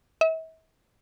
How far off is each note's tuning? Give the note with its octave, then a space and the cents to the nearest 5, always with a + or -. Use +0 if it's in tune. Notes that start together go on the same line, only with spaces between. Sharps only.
E5 -40